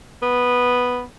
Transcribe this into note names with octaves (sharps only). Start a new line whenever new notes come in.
B3